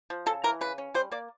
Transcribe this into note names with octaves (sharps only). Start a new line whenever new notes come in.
F3
C#3 A4
E3 A#4
C#3 B4
C#4
G3 C5
A#3 D5